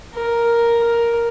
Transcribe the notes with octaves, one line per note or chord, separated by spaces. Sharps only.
A#4
A#4